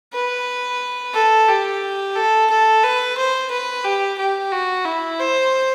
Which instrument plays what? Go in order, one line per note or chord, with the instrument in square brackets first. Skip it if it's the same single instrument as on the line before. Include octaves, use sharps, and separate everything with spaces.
[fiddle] B4
A4
G4
A4
A4
B4
C5
B4
G4
G4
F#4
E4
C5